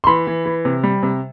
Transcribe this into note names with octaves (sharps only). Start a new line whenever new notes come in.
C6
E3 B5
E3
E3
C3
G3
C3